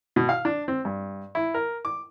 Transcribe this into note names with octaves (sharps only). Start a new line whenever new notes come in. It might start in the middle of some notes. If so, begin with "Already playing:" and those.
B2
F5
D4
C4
G2
E4
A#4
D6